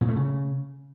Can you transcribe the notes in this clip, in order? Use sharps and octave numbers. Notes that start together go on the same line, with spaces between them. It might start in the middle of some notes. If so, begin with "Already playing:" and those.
A#2
A3
C#3